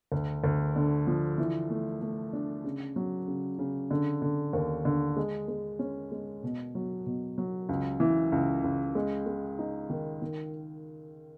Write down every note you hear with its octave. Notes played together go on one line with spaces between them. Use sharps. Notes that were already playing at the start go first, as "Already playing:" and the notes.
D2
D2
D3
F3
E3
A3
A3
D4
C#3
F#3
C#3
C#3
D3
D3
D#2
D3
G#3
G#3
C#4
G#3
B2
F#3
B2
F#3
C#2
E3
C#2
C#2
G#3
G#3
D#4
D#3
D#3